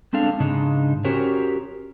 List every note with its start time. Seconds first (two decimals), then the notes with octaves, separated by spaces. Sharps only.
0.13 G#3 C4 D4 A4 F5
0.40 G#2 C#3 G#3 D4 D#4
1.04 C#4 F#4 G4 A#4 C5 C#5